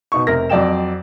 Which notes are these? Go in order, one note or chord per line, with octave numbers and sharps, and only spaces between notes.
B2 D#4 C#6
F1 C3 A#4 A#6
F2 F#3 D5 D#5 G5 E7